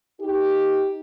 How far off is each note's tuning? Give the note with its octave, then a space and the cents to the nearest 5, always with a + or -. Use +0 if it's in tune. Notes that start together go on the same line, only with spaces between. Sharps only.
D#4 +10 G4 +0